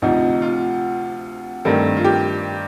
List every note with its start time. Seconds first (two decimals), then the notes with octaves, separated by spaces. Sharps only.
0.02 D2 C3 F3 D#4
0.42 F4
1.65 G2 D#3 A3 C4
1.97 F4
2.04 G4